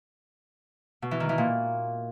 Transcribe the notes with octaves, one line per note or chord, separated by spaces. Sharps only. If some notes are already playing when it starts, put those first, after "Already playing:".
B2
E3
D#3
E3
A#2